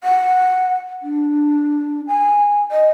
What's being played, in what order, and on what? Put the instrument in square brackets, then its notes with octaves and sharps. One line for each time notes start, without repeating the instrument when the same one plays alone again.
[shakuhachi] F#5
D4
G#5
D#5